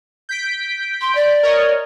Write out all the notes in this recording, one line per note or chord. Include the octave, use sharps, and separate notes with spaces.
G6 B6 D7
C6
D5
A#4 C#5 D#5